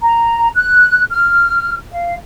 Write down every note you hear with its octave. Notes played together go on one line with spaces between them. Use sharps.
A#5
F#6
F6
F5